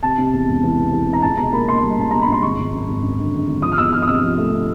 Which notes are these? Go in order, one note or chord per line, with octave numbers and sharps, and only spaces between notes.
C3 A5
C3
E2
E1
E3
C3
E3
C3
A#5
C#2 A5
B2 A#5
A#3 B5
A#3 C6
G3
C#2 A5
B2 A#5
B5
C#2 C6
G#1 C#6
G#1
F#2
G#1
F#2
D3
F#2
G#1
F3 D#6
F6
E2 E6
F3 F6
D#6
C3 E6
F3
A3
C3